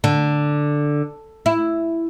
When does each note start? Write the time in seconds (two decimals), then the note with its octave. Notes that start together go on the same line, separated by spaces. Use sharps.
0.04 D3
1.46 E4